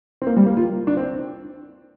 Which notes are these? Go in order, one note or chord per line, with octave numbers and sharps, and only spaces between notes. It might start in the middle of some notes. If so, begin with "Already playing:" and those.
C4
A#3
G3
A#3
F4
D4
C4